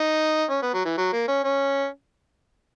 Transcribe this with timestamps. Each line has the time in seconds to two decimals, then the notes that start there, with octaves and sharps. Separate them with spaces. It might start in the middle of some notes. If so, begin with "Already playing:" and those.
Already playing: D#4
0.50 C#4
0.62 B3
0.74 F#3
0.85 E3
0.97 F#3
1.12 A#3
1.28 C#4
1.44 C#4